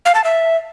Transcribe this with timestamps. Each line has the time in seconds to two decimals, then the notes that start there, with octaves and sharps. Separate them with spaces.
0.05 F5
0.15 A5
0.24 E5